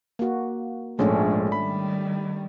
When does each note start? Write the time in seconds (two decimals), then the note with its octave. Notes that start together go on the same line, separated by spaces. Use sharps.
0.19 A#3 F#4
0.99 A#1 G#2 G#3 A3 C#4 D4
1.52 D#3 G3 B5